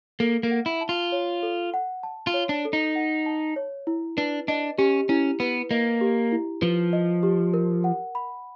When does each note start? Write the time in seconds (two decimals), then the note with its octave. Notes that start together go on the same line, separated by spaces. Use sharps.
0.20 A#3 A4
0.43 A#3
0.51 F#5
0.66 E4
0.81 A5
0.89 F4
1.12 C#5
1.43 A4
1.74 F#5
2.03 A5
2.27 F4
2.34 C#5
2.49 D4
2.65 A4
2.73 D#4
2.95 F#5
3.26 A5
3.56 C#5
3.87 E4
4.17 D4 B4
4.48 D4 D#5
4.78 C#4 G4
5.09 C#4 E4
5.40 B3 B4
5.71 A#3 D#5
6.01 G4
6.32 E4
6.62 F3 B4
6.93 D#5
7.23 G4
7.54 A#4
7.84 F#5
8.15 B5